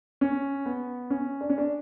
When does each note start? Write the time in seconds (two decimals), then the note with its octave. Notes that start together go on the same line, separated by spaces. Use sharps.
0.21 C#4
0.66 B3
1.10 C#4
1.41 D4
1.50 C#4
1.58 D4